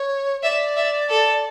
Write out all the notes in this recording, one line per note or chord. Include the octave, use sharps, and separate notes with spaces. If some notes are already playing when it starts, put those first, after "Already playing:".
Already playing: C#5
D5 E5
E5
A4